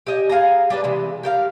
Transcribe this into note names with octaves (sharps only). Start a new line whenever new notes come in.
G4 D#5 G#5
G#4 F5 G#5 A#5
G3 D4 D#4 B4
C3 E3 G#3
G4 A#4 F5